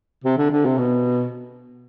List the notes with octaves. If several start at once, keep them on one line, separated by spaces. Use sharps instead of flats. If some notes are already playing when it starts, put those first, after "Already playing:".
C3
D3
D3
C3
B2